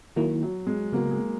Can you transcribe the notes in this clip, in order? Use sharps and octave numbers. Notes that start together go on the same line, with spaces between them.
D#3 F#3 A#3 E4
F#3
G#3
C#3 F#3 A#3 B3 F#4
G#3